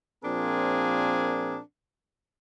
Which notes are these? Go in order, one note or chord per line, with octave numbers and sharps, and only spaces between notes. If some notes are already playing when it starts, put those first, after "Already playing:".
A#2 F3 C4 D4 G#4 A#4